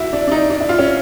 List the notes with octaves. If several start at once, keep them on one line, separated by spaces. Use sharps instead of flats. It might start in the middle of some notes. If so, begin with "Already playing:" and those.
Already playing: E4 F#4
D4
D4
D#4
D4
E4
F4
C#4